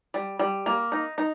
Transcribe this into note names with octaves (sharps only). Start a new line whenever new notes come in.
G3
G3
A#3
D#4
D#4